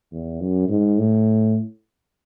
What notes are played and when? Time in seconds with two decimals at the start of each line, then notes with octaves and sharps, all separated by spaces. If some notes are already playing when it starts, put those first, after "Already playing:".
0.12 E2
0.41 F#2
0.69 G#2
0.98 A2